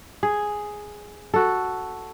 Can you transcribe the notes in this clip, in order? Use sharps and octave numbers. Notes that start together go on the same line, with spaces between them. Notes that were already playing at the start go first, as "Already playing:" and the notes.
G#4
F#4 A4